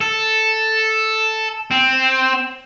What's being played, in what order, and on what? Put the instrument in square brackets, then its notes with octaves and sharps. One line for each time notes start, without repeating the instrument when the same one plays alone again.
[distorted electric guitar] A4
C4